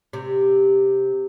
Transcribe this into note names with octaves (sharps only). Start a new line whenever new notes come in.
C3